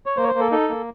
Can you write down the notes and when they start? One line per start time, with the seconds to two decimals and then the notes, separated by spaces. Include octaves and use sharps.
0.06 C#5
0.17 A#3 C5
0.23 C#5
0.28 C5
0.35 A#3
0.40 A4
0.51 D#4 A4
0.69 A#3